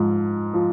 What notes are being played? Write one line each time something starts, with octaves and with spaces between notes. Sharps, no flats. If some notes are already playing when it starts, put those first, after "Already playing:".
Already playing: G#2 F3
F3